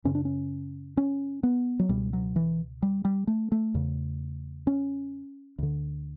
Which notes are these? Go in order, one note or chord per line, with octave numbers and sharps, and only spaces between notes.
F#2 C#3 C#4
D4
C#4
C#4
B3
F#3
C#2 B2 G3
F#3
E3
G3
G3
A3
A3
E2 C#3
C#4
D2 D3